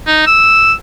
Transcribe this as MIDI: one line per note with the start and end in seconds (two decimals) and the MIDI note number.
0.07 0.24 63
0.27 0.73 88